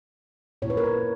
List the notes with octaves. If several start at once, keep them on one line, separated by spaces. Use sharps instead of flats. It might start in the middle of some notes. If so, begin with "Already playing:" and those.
A#2 A#3 E4 C#5
B4
A#4
B4